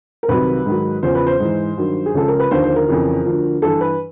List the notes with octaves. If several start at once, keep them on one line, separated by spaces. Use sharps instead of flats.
A#4
C2 C3 D#3 F#3 B4
G#2 D#3 F#3
E2 C#3 F3 C5
B4
C5
G#2 E3
G2 D#3 F#3
G#4
C#2 C#3 F3 A4
A#4
B4
D#2 D3 F3 C5
C5
A#4
F2 C#3 E3
D2 D3 F3
G2 E3 A4
B4